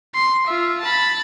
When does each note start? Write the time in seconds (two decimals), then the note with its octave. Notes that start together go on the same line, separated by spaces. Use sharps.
0.15 C6
0.46 F4 E5
0.81 A5 B5